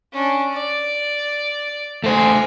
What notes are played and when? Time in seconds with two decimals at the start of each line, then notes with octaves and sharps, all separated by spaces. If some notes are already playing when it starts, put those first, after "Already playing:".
0.12 C#4 D4
0.53 D5
2.04 A3 C5 G#5